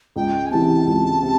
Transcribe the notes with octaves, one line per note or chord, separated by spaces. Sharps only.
C#2 G5
G#5
C3 E3 A5
C#2
C3